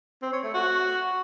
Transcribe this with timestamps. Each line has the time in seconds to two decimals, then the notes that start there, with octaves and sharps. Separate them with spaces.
0.22 C4
0.33 C#5
0.44 A3
0.54 F#4